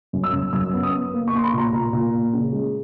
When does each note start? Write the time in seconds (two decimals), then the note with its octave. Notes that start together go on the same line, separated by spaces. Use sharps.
0.13 F#2
0.24 E6
0.33 F#2
0.53 F#2 E6
0.73 B3
0.83 D#6
0.93 B3
1.14 A#3
1.28 C#6
1.33 A#3 C6
1.43 B5
1.53 A#2
1.58 A#5
1.73 A#2 A#5
1.93 A#2
2.13 A#3
2.33 C#3
2.52 G#3